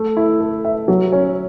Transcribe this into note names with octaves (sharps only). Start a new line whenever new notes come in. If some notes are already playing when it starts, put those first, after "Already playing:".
Already playing: A3
E4
A4
E5
F#3
C#4